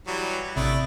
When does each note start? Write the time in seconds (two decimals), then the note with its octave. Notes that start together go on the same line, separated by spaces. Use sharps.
0.07 E3 F#3 G3
0.56 A1 C3 A3 D4 E4 D#6